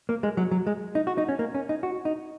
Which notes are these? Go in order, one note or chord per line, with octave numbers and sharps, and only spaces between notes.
A#3
G#3
F#3
F#3
G#3
D#4
F#4
D#4
C#4
A#3
C#4
D#4
F#4
D#4